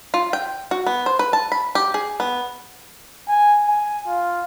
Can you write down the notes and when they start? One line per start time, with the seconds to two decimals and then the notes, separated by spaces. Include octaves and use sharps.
0.14 F4
0.33 G5
0.71 F#4
0.87 B3
1.06 C5
1.19 B4
1.33 A5
1.52 B5
1.75 G4
1.94 G#4
2.20 B3
3.29 G#5
3.68 G#5
4.07 F4